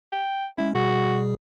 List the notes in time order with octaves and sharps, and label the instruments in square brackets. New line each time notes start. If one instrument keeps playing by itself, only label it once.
[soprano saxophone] G5
[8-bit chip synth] G#3 C#4 [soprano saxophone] E4
[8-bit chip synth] B2 G3 G#4 [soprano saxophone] F#4